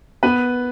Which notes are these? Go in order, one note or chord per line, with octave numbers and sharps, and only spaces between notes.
B3 B4